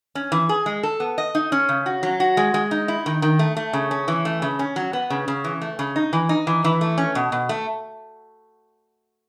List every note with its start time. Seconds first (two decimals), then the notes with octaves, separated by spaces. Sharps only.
0.15 C#4
0.32 E3
0.49 G#4
0.66 G#3
0.83 A4
1.00 B3
1.18 D#5
1.35 D#4
1.52 C#4
1.69 C#3
1.86 F#4
2.03 F#3
2.20 F#4
2.37 G#3
2.54 G#3
2.71 D#4
2.88 E4
3.06 D#3
3.22 D#3
3.39 A3
3.57 A3
3.73 C#3
3.91 C#4
4.08 E3
4.25 A3
4.42 C#3
4.59 C#4
4.76 F#3
4.93 B3
5.10 C#3
5.28 C#3
5.44 E3
5.61 A3
5.79 C#3
5.96 D#4
6.13 E3
6.29 D#4
6.47 E3
6.64 E3
6.81 A3
6.98 C#4
7.15 B2
7.32 B2
7.49 A3